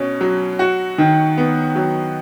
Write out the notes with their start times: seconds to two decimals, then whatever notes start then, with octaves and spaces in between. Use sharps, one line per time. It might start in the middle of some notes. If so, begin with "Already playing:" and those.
Already playing: B2 C#4
0.21 F#3
0.59 F#4
0.98 D#3
1.37 B3
1.75 F#3